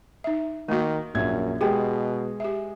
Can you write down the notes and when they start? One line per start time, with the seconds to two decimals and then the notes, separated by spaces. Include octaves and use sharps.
0.24 D#4 E5
0.69 D#3 A3 A#3 F#4
1.15 A#1 F#2 E5 G#6
1.61 B2 G#3 G4 G#4 G5
2.40 G4 E5